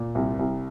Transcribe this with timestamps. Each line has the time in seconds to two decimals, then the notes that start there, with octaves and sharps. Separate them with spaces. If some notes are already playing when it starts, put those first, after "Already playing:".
Already playing: A#2
0.15 C2
0.39 C2